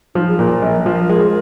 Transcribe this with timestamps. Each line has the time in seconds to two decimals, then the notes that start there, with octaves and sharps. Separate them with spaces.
0.15 F3 D#4
0.27 G#4
0.39 A#2 A#4
0.62 A#1
0.86 F3
1.09 G#3